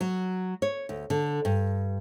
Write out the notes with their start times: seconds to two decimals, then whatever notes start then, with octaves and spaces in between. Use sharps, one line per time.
0.01 F#3
0.62 C#5
0.89 D2
1.10 D3
1.45 G2